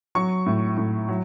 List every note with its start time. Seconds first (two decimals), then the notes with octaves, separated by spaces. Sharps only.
0.15 F#3 C#6
0.46 A2
0.77 A2
1.09 F#3